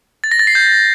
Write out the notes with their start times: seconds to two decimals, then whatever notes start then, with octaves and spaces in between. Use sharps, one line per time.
0.24 A6
0.32 A#6
0.39 A6
0.47 C7
0.55 G6